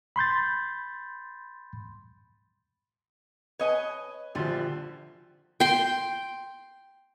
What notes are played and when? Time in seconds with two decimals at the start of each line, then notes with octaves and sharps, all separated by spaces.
0.16 B5 C6 G6 A6
3.59 B4 C#5 D#5 G#5
4.35 A#1 D3 F3 G3 F4
5.60 G5 C6